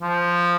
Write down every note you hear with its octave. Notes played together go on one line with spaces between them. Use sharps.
F3